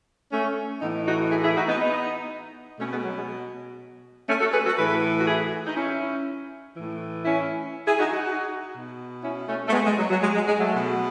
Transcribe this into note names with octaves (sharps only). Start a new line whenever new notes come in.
A3 C#4
A2 E3 B3 D#4
D#4 F#4
E4 G#4
E4 G#4
D#4 F#4
B3 D#4
B3 D#4
B2 A3 C#4
G#3 B3
F#3
G#3
A3 C#4
F#4 A4
G#4 B4
F#4 A4
A2 E3 G#4 B4
F#4
E4 G#4
D#4
C#4 E4
A2 E3
C#4 E4
E4 G#4
D#4 F#4
D#4 F#4
B2
C#4 E4
A3 C#4
A3
G#3 B3
G#3
F#3
F#3
G#3
G#3
G#3
F#3 A3
B2